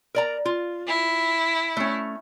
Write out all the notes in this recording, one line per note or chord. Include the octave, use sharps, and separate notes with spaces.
A#4 D5 A#5
F4
E4
A3 C#4